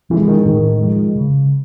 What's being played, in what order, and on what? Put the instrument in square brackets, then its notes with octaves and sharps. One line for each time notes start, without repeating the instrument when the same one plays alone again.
[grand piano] E3 [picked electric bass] F3
[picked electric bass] G#3
[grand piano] D#3
[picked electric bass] A2 [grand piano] D#3
[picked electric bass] F3 G#3
C#3